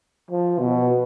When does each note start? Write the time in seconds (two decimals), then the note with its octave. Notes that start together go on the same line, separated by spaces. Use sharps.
0.31 F3
0.59 B2